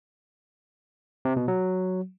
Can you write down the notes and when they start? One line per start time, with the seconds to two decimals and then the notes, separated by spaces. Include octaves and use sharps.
1.25 C3
1.37 B2
1.48 F#3